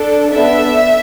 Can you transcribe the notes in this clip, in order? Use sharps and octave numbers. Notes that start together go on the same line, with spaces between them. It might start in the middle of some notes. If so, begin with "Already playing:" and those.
Already playing: D4 A4
B3 D4 A4 E5